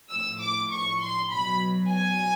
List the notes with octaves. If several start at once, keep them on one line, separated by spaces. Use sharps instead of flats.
A2 F3 E6
D6
C#6
C6
B2 F#3 B5
G#5